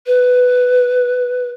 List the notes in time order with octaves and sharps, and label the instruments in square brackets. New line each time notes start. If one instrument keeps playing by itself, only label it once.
[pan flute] B4